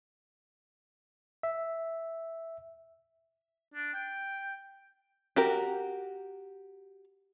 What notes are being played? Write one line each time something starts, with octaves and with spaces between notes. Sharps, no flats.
E5
D4
G5
F#4 G4 A#4